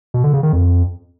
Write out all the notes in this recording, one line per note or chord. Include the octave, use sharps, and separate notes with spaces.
B2
D3
C#3
D#3
F2